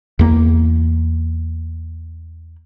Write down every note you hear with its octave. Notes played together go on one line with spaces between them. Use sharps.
E2 A#3